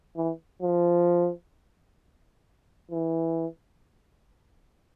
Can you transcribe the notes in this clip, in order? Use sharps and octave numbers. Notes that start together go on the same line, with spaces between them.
E3
F3
E3